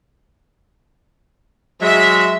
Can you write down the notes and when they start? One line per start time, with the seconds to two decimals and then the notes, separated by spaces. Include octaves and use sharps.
1.81 F#3 G#3 E5